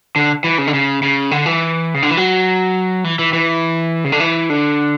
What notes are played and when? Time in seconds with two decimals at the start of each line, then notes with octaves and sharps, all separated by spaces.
0.16 D3
0.44 E3
0.58 C#3
0.67 D3
0.74 C#3
1.03 C#3
1.31 D3
1.46 E3
1.94 C#3
2.02 D3
2.11 E3
2.17 F#3
3.04 E3
3.19 E3
3.33 E3
4.04 C#3
4.12 D3
4.20 E3
4.50 D3